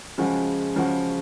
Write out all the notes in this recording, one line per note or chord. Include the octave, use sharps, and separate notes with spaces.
C#3 F3 G#3 C#4 F#4
C#3 F3 G#3 C#4 F#4